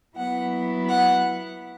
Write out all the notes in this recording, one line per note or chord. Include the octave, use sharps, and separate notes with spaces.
F#3 B3 E4 F#5
F#5